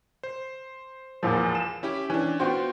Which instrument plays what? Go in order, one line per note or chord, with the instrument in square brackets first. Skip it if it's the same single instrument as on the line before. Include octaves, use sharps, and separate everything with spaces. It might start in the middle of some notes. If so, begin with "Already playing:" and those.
[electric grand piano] C5
[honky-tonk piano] E2 A#2 F3
E7
[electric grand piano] C#4 E4 G4
[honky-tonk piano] E3 [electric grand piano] C#4 D4
[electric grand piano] B3 F4 F#4 [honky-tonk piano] C5 G5